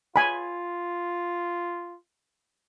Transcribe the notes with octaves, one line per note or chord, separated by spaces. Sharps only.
F4 G#5 B5